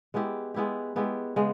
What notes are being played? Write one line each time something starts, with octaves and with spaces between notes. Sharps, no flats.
G#3 B3 E4 G4
G#3 B3 E4 G4
G#3 B3 E4 G4
C#3 G#3 B3